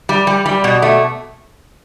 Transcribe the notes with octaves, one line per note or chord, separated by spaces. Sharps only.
G3
G3
G3
B2
A3